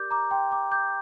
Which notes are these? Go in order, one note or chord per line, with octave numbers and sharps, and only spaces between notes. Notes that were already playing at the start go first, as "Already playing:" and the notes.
Already playing: G4 A#4 D5 D6 G6
A#5 D6
G5 C6
A#5 D6
D6 G6